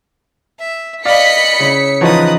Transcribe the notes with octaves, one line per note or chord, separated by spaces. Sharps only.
E5
D5 D#5 F5 B5 B6 C#7
C#3 E4
E3 F3 D#4 B4 F#5 A#5 C#6 D#6